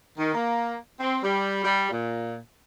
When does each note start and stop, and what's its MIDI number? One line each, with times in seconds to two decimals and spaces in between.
0.18 0.31 51
0.33 0.75 58
1.00 1.17 60
1.24 1.61 55
1.64 1.87 55
1.91 2.35 46